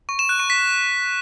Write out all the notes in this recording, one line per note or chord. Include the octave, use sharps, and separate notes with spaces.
C#6
E7
F#6
C#6
B6